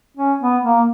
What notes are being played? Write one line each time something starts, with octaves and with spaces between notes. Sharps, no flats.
C#4
B3
A#3